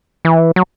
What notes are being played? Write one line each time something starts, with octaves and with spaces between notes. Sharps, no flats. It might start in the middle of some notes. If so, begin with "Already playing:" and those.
E3
F#3